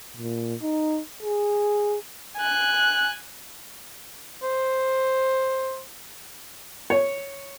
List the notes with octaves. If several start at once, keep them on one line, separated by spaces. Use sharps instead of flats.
A#2
D#4
G#4
G#5 F#6
C5
C#5